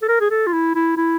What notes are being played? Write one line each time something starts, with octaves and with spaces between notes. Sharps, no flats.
A4
A#4
G#4
A4
F4
E4
E4
E4